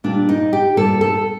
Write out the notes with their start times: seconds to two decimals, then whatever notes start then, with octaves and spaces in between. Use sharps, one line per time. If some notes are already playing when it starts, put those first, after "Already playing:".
0.04 A#2 G3 D4
0.29 D#4
0.53 G4
0.77 A#2 G3 A4
1.01 A4